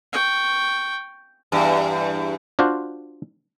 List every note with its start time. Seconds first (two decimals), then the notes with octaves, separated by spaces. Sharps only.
0.13 G5 C#6
1.52 E2 G2
2.59 D4 F4 F#4 C5